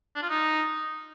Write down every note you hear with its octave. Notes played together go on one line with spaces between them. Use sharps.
D4
F4
D#4